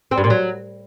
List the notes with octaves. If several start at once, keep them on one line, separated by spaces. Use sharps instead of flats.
C4
G2
A#2
F#3